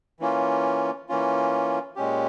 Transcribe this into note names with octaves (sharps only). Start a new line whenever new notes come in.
E3 A#3 C#4 F4
E3 A#3 C#4 F4
A#2 G#3 C#4 G4